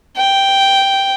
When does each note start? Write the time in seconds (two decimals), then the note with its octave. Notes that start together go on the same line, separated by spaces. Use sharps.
0.16 G5